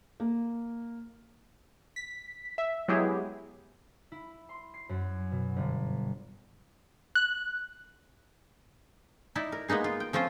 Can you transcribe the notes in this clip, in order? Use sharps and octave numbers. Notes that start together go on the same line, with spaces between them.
A#3
B6
E5
F#3 G#3 B3 E4 G4 G#4
E4
C6
C7
F#2
B2
G1
F#6
D#4 E4 D5
A#4
G#3 A#3 B3 D#4 G#4
F4
G5
F3 C4 C#4 F4 C5